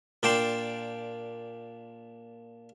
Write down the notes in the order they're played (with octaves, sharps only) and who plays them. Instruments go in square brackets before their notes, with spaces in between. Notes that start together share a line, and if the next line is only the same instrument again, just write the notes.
[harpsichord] A#2 D4 D5 G5 A5 C6